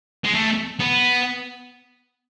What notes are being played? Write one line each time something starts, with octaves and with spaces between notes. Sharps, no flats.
G#3
A3
B3